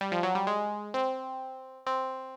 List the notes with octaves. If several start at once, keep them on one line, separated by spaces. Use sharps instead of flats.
G3
F3
F#3
G3
G#3
C4
C4